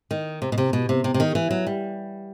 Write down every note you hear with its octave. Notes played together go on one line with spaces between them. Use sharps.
D#3
C3
B2
C3
B2
C3
C3
C3
D#3
E3
F#3
G3